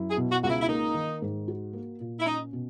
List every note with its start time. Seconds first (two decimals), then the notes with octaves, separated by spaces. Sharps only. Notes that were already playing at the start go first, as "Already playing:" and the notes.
Already playing: F#2 E4
0.10 G#4
0.17 B2
0.30 F#4
0.43 C#2 F#4
0.49 E4
0.61 E4
0.69 A#3 D#4
0.95 D#3
1.22 G#2
1.48 F#4
1.73 A#3
2.00 A#2
2.20 E4
2.26 C#4 D#4
2.53 B2